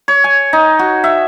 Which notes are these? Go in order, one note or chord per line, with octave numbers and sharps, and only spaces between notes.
C#5
G#5
D#4
F#4
E5